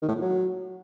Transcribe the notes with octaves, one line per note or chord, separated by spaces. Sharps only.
D#3
A2
A#2
F#3